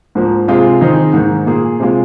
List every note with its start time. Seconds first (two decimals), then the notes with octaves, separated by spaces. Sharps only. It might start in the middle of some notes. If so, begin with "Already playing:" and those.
0.15 G#2 F3 A#3
0.48 C3 G#3 F4 G#4
0.81 D#3 C4 D#4 G#4
1.13 G#2 D#3 A#3
1.46 A#2 A#3 G#4
1.80 C3 G#3 F4